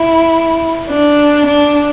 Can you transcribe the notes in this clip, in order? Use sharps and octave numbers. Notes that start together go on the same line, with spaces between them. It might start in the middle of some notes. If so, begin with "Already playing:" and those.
Already playing: E4
D4
D4